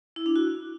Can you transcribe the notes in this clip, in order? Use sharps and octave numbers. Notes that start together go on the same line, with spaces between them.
E4
D4
F#4